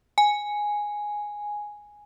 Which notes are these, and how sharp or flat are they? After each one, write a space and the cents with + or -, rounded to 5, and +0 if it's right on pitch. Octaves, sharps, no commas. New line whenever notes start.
G#5 +0